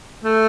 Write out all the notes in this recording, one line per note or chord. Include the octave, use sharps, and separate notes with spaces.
A3